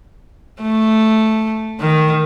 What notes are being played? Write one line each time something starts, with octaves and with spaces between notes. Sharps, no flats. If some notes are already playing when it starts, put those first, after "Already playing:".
A3
D#3